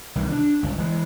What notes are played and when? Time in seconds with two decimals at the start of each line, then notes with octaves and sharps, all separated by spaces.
0.15 C2 D#3 E3 G3
0.32 D4
0.63 G1 C#2
0.78 E3 G#3